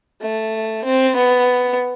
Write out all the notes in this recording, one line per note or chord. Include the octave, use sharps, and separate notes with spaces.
A3
C4
B3